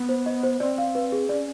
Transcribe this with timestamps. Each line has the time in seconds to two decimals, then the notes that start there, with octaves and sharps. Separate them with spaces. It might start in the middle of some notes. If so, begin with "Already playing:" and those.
Already playing: B3
0.09 C5
0.26 D#5
0.43 C5
0.60 C4 D5
0.78 F5
0.95 B4
1.12 G#4
1.29 C#4 D5